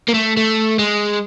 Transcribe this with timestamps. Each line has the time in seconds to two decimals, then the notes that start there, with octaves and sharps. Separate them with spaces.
0.09 A#3
0.14 A3
0.37 A3
0.79 G#3